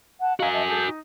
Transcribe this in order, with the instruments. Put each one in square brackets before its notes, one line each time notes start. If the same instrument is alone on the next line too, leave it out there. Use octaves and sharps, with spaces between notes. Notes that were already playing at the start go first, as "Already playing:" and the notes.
[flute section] F#5 A5
[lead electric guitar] F#4 G#5 [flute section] D#5 F5 A#5
[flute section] D#5 E5 A5
G#4 A4 G6
D#4